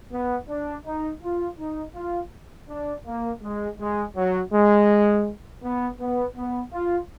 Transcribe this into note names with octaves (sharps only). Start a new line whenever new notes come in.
B3
D4
D#4
F4
D#4
F4
D4
A#3
G#3
G#3
F#3
G#3
B3
B3
B3
F4